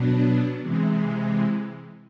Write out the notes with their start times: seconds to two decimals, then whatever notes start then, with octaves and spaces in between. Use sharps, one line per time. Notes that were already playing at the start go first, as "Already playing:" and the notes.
Already playing: B2 F#3 B3 D4
0.61 C3 E3 G#3